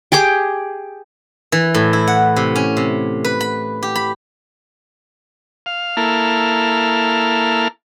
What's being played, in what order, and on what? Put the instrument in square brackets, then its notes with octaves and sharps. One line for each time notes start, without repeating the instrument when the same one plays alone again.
[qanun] G4 G#4 G5 D6
[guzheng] E3
A2
E4
F#5
C3
C#4
C3
B4
B5
G4
B5
[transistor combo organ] F5
A#3 E4 A4 F6